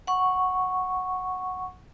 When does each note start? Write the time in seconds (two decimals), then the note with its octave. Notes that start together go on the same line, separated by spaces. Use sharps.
0.07 F#5 C#6